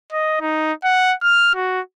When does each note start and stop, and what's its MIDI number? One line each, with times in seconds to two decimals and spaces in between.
0.13 0.37 75
0.41 0.73 63
0.84 1.14 78
1.22 1.54 89
1.55 1.81 66